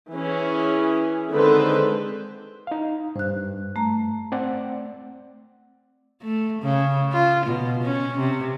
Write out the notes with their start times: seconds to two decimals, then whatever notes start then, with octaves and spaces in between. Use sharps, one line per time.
0.11 E3 C#4 G#4
1.31 D3 D#3 G#3 C4 B4 C5
2.67 D#4 F5
3.16 G2 C5 F#6
3.76 A3 A#5
4.32 C4 D5 F#5
6.22 A3
6.62 C#3
7.12 F4
7.46 B2
7.82 C#4
8.18 C3